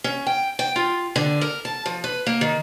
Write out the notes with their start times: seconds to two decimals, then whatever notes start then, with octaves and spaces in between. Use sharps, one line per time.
0.04 C#4
0.27 G5
0.59 G5
0.76 F4
1.16 D3
1.41 A#4
1.65 A5
1.86 F3
2.04 B4
2.27 A#3
2.41 D#3